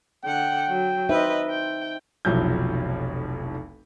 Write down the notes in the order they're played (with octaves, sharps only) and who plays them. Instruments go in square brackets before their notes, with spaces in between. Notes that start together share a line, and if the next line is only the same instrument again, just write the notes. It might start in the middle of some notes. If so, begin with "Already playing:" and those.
[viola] D3 F#5 [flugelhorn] G5
[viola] F#3
[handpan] D#4 C5 E5 [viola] B4 D#5
[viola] G5
[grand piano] F1 B1 F3 F#3 E4 G6